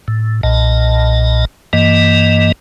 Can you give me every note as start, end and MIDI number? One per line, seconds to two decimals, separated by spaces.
0.08 0.41 45
0.43 1.45 35
0.43 1.45 46
0.43 1.45 75
0.43 1.45 81
1.73 2.52 43
1.73 2.52 52
1.73 2.52 58
1.73 2.52 75